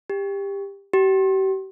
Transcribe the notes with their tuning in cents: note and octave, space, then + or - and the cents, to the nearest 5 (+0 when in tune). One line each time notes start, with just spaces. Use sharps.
G4 +20
G4 -40